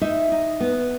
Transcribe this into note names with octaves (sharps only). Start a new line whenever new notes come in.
D#4 E5
D#4
B3